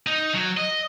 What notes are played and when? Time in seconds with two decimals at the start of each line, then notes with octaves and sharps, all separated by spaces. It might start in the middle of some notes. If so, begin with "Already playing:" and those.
0.07 D#4
0.34 F#3
0.57 D#5